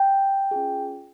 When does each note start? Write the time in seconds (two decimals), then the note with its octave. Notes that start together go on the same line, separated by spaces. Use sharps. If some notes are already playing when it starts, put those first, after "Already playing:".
Already playing: G5
0.51 C#4 F4 G#4